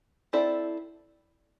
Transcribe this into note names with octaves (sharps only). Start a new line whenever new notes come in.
C4 E4 A4 D5